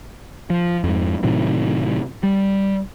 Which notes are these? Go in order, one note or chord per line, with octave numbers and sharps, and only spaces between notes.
F3
F2 G#2
A2 C3 D#3 F#3
G3